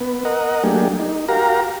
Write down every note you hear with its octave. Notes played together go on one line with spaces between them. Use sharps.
B3
A#4 D#5 F#5
F#3 A3 A#3 D4 G4 G#4
D#4
F#4 G4 A#4 F5 A#5